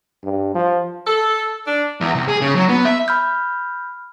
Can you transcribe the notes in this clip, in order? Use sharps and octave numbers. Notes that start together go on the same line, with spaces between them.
G2
F3
A4
D4
E2
C2
G#4
C#3
F#3
B3
E5
B5 F6 G6